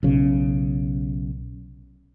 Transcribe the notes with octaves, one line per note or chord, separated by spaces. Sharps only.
B1 C#3